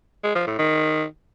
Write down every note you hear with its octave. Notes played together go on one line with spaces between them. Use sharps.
G#3
F3
A2
D#3